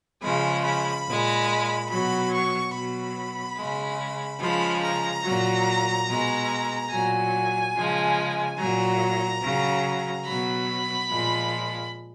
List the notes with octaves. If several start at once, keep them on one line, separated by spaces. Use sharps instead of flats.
C#3 F3 G#3 B5
B5
A#2 G#3
B2 F#3 B5
C#6
B2 F#3 B5
C#3 G#3
C#3 F3 G#3 B5
A#5
A#2 F#3
B2 G#3
A#2 F#3 G#5
C#3 F3 G#3
A#2 F#3 A#5
C#3 F#3
B2 F#3 B5
A#2 F3 G#3